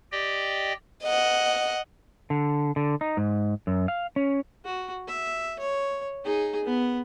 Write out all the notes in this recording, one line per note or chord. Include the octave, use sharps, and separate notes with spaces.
G4 D5 D#5 G5
D#5 F#5
D3
D3
D#4
G#2
F#2
F5
C#4
F#4
E5
C#5
D#4 G#4
B3